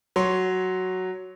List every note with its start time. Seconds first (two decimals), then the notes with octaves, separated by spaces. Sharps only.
0.16 F#3 C#5 C6